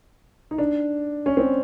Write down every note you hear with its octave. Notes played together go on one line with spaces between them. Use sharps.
D#4
D4
C#4
C4